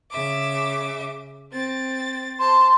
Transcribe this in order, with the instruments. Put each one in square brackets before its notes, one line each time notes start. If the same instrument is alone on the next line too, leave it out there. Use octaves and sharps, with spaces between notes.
[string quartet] C#3 E5 D6
C4 A6
[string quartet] C5 A5 [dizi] C6